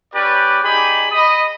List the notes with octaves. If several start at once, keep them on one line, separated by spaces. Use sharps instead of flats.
C#4 G4 B4 D5
D#4 G4 G#4 D5 B5
D#5 B5 D#6